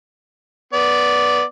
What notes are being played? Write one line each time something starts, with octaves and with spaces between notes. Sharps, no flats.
B3 D5